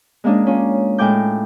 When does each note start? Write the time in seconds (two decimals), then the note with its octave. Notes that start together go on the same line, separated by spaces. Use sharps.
0.24 G#3 A#3 C#4 D4 G#4
0.47 C#4 F4
0.98 A2 G#3 G5 G#5 D6 G6